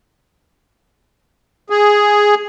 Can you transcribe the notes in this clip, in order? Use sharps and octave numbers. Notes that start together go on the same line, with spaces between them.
G#4